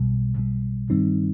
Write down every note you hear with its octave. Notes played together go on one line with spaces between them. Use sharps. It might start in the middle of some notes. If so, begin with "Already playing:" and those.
Already playing: B1 B2 G3
B1 B2 G3
G2 D#3 G3 C4 D#4